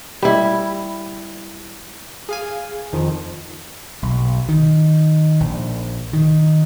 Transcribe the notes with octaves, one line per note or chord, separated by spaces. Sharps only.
G3 E4
G#4 F5 G#5
F2 D#3 F3
B1
D#3
A#1
D#3